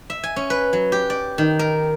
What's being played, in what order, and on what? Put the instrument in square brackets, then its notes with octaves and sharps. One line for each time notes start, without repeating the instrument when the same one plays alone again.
[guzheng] E5
G#5
C#4
B4
F#3
G4
D5
D#3
A#4